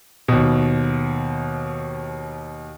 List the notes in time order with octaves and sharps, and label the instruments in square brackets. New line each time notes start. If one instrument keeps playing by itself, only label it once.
[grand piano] D#2 B2